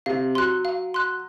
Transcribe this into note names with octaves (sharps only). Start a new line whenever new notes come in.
C3 F5
F#3 C6 F#6
F5
C6 F#6